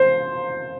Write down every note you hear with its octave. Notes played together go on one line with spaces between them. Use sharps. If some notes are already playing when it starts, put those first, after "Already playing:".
Already playing: C5